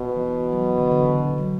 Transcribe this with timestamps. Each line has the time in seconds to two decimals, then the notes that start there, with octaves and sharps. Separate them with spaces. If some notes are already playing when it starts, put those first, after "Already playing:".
Already playing: B2
0.17 E3
0.53 F#3
0.57 E3
0.78 D3
0.91 D3
0.98 C#3
1.18 D3
1.38 F#3